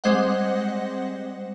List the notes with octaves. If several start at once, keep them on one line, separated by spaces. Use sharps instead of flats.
G3 G#3 C4 C5 D#5 F#5